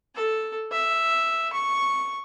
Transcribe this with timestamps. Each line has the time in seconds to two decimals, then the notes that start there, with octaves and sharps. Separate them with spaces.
0.15 A4
0.72 E5
1.53 C#6